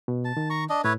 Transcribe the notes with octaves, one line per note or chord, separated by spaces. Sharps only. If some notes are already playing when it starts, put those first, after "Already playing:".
B2
A5
D#3
A#5 C#6
D4 D#5
A2 E4 B4 C#5